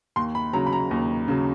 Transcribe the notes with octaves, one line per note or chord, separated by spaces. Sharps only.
D#2 C6
B5
C#3 F#3 A#5
B5
A#5
D#2
C#3 F#3